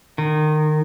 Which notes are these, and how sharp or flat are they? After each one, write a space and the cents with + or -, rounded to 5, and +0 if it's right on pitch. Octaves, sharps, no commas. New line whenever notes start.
D#3 -25